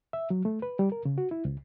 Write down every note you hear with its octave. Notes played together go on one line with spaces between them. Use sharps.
E5
F#3
A3
B4
G3
A#4
C#3
F#4
E4
C#2